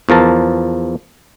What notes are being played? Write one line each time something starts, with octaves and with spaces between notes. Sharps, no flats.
E2 F3 A#4 A5